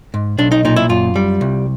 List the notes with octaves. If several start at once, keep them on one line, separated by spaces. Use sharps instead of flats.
G#2
B1 D4
D#4
A#2 D#4
E4
F#2 F4
G3
C2